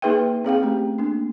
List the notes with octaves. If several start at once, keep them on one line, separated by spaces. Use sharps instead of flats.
A#3 D#4 G#4 B4 E5 G5
C4 G#4 F5 G5
A3 C#4 G4
A#3 D4